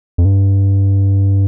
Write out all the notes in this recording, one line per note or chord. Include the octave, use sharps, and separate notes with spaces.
F2
G2